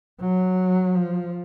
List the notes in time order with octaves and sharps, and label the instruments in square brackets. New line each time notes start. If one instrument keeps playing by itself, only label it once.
[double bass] F#3
F3